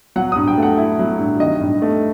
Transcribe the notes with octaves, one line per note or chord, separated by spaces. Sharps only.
F#3 F#5
G2 D#6
G5
A3 F#5
E4
F#3
G2
D#3 D#5
G2
A3